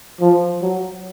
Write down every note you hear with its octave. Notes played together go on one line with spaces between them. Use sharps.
F3
F#3